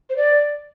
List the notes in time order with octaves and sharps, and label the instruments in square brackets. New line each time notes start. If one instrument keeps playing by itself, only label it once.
[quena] C5
D5